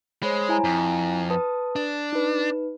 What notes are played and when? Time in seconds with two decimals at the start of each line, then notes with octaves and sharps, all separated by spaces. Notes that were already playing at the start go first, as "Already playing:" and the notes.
0.23 G#3 C5 C#5 B5
0.49 E4 G#5 A#5
0.64 F2
1.30 B4 A5 D#6
1.76 D4
2.13 D#4 B4